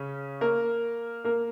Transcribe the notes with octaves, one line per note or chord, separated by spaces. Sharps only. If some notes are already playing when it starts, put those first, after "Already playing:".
Already playing: C#3 C#4
A#3 A#4
A#3 A#4